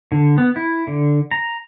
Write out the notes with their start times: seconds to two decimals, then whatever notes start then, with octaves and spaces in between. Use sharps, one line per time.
0.12 D3
0.38 B3
0.56 E4
0.87 D3
1.31 A#5